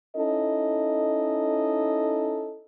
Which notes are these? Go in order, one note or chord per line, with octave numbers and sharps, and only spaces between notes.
C#4 D#4 E4 A4 D#5